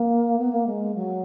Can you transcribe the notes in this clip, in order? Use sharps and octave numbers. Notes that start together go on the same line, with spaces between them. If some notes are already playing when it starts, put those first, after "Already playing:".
Already playing: A#3
B3
A#3
G#3
F#3